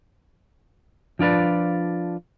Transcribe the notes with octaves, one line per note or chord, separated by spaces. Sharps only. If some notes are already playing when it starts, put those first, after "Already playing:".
F3 D4 F4 B4 D5